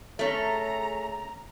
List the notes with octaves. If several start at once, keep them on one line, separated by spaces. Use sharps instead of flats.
A3 C#4 G#4 C#5 E5 A#5